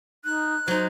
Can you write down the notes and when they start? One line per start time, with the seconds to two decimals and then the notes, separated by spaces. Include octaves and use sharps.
0.25 D#4 F#6
0.68 F#3 D#4 C5